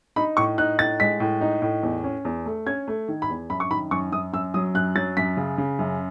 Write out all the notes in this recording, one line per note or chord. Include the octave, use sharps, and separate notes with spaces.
D#4 B5
A2 C#6
D#4 F#6
A2 A6
G#3 B6
A2
D#4
A2
E2
C#4
E2
A3
C#4 G#6
A3
D#3
B5
E2
F#2 B5
C#6
D#3 B5
F#2 C#6
F#2 D#6
F#2 E6
F#3 D#6
F#2 F#6
F#3 A6
F#2 B6
C#3
C#3
F#2